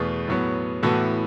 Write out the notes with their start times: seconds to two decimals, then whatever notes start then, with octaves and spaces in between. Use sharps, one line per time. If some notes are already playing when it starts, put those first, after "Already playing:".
Already playing: E2 B2 A3 G#4 B4
0.28 A2 F#3 B3
0.83 A2 E3 B3 F#4 A4